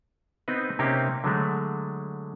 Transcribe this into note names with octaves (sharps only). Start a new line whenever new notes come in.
B3 C4 D#4 B4
C3 A#3 C4 C#4 D#4 G4
D3 F#3 G#3 A3